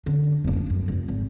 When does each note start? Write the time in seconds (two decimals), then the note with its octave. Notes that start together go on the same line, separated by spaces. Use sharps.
0.06 D3 D4
0.44 F1 A#3
0.56 D4
0.70 F#2
0.88 F1
1.08 G#1